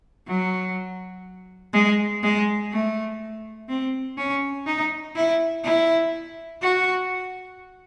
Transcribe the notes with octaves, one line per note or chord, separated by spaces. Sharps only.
F#3
G#3
G#3
A3
C4
C#4
D#4
E4
E4
F#4